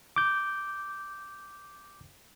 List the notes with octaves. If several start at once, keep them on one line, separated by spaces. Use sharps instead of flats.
D6 G6